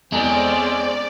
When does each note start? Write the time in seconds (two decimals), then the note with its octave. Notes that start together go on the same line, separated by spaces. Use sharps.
0.12 E2 G#3 C4 C#4 A4 D5 G5